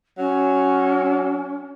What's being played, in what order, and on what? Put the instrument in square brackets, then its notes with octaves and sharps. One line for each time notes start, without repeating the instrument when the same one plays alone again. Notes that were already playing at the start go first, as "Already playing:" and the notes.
[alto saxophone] F#3 [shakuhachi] C#4